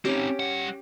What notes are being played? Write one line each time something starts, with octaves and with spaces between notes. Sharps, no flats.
C4 C#4 D#4 G4
G3 F#5